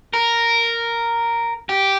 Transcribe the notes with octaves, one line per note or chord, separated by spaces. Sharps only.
A#4
G4